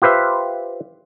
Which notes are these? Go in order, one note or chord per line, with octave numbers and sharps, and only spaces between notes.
F4 G4 B4 C5 E5